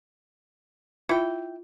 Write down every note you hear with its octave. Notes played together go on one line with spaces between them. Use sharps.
E4 F4 G5